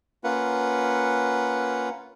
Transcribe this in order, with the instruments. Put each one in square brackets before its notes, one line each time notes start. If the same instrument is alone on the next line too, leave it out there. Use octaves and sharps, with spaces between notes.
[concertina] A#3 C#4 F4 B4 F#5